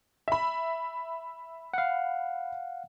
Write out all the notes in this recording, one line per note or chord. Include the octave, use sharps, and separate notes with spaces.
E5 B5
F5 F#5